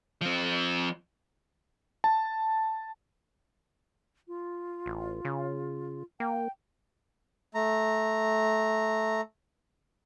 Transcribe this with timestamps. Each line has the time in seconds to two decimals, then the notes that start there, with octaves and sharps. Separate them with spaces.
0.21 F3 C4
2.04 A5
4.28 F4
4.86 A1
5.25 C#3
6.20 A#3 G5
7.55 A3 A#5